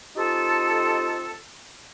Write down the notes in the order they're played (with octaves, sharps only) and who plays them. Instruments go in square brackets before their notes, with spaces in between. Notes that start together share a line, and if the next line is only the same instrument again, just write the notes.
[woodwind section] C4 D#4 F4 G4 A4